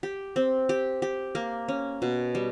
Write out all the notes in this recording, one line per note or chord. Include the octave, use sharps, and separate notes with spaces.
G4
C4
G4
G4
A#3
C#4
B2
G3